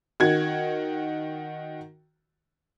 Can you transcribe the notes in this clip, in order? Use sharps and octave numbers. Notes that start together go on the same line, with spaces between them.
D#3 F#4 G#6